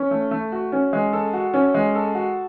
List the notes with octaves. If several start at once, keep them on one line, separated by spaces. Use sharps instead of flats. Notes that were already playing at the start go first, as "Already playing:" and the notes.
Already playing: C#4
A3
A3
F#4
C#4
G#3
A4
F#4
C#4
G#3
A4
F#4